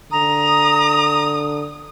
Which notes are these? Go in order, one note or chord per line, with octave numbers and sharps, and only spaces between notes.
D3 A#5 D#6